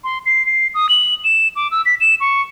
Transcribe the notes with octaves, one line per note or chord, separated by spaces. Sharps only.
C6
C7
C7
D#6
F#7
E7
D6
E6
B6
E7
C#6